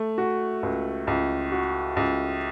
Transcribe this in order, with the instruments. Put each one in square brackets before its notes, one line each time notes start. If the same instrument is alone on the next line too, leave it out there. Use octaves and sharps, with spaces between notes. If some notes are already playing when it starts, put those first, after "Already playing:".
Already playing: [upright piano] A3
F#4
C#2
C#2
F#4
C#2